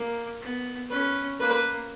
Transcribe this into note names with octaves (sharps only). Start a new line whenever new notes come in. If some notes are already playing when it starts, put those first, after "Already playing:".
Already playing: A#3
B3
C#4 B4
A#3 B4